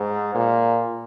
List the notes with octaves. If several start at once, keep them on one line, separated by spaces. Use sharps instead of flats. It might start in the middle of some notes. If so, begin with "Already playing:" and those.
Already playing: G#2
A#2